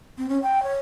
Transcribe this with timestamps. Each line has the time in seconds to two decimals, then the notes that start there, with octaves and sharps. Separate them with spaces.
0.18 C4
0.29 C#4
0.43 G5
0.63 C#5